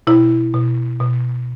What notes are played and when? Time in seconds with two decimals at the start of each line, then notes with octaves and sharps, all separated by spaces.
0.07 B2 E4
0.54 B2
1.00 B2